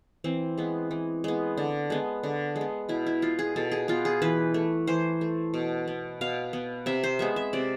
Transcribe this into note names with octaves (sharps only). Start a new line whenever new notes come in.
E3 C4
G#3 B3
E3
G#3 B3
D3
G#3 B3
D3
G#3
B3
B2 E4
E4
B3 F4
G#4
B2 A4
G#4
B3 F4
G#4
E3 B4
A3
E3 C5
A3
B2
B3
B2 F5
B3
C3 E5
C5
G#3 B3 E5
E5
C3 D5